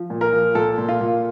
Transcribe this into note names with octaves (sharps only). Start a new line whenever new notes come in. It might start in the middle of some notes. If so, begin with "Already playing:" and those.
Already playing: F3
A#2
A#4
F3
A#2 A4
A#2
F4
A#2